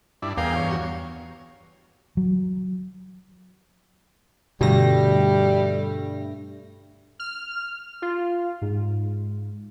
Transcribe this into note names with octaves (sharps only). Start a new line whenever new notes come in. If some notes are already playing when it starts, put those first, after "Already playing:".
G2 D4 E4
E2 G#4 A#4 F5 G5
G2 C#5
F#4
F#3
G2 B2 D3 G3 A3 A#6
F6
F4
G#2